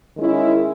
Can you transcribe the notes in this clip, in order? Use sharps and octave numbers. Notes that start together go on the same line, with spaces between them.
D#3 G#3 C#4 E4